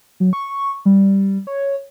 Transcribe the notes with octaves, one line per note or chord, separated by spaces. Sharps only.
F#3
C#6
G3
C#5